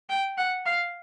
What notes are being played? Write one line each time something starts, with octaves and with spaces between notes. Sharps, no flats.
G5
F#5
F5